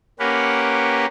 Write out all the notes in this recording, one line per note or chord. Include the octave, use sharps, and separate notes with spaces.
A#3 C#4 G4 A#4 B4 F#5